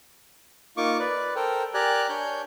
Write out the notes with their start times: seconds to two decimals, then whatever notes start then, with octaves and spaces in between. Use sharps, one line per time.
0.77 A#3 D#4 F4 C#6 D6
0.99 B4 D5
1.36 A4 A#4 C5 G5
1.74 G4 A#4 D5 G#5 A#5 F#6
2.09 D4 C#5 G#5 G6